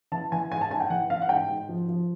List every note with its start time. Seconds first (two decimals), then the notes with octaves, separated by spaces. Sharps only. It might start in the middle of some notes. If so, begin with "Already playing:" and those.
0.12 E3 A5
0.32 E3 G#5
0.52 G#2 G#5
0.61 A5
0.71 G#2 G#5
0.80 G5
0.90 E3 F#5
1.10 E3 F5
1.22 F#5
1.29 G#2 G5
1.49 G#2
1.69 F3
1.88 F3